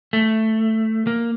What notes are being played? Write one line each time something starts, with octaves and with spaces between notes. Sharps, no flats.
A3
A#3